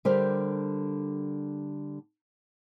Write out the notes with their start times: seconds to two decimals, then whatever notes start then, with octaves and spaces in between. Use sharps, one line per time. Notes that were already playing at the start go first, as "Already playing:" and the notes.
0.05 D3 G3 G4 A#4 C5